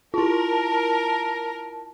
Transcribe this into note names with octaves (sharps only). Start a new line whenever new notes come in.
E4 F4 A#4 A5